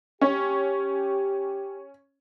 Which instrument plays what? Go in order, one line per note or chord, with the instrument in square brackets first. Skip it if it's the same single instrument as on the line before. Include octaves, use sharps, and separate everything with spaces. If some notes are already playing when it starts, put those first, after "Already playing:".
[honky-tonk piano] C#4 [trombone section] G4